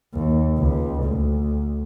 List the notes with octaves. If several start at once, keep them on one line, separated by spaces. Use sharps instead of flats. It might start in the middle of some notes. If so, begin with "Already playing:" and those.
D#2
C#2
D2